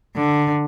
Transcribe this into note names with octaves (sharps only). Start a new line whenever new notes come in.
D3